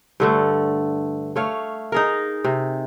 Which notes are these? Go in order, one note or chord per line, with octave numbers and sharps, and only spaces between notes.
G2 D3 A3
A3 C#5 F5
D#4 G#4 A#4
C3